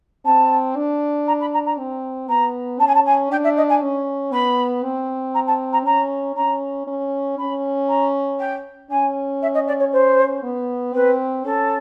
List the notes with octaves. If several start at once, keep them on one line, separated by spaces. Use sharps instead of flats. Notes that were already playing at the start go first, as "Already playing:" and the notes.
C4 A5
D4
A#5
B5
A#5
A#5
C4
B3 A#5
C#4 A5
G#5
A5
G#5
D4 G5
E5
D#5
G#5
C#4
B3 B5
C4
A#5
A5
A#5
C#4 A#5
C#4 A#5
C#4
C#4 B5
A#5
G5
C#4 G#5
E5
D#5
D5
C#5
C5
B3
C4 B4
C#4 A4